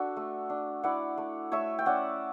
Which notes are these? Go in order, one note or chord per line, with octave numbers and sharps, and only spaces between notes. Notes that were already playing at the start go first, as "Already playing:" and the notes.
Already playing: D4 F#4 A4
A3
D4
E4 D5 F#5
A3
A3 C#5 E5
G5
C#4 D5 F#5